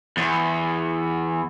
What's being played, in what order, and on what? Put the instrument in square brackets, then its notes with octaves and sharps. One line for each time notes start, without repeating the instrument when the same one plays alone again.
[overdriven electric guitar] E2